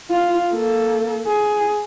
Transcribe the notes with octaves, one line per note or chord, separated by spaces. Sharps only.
F4
A#3 A4
G#4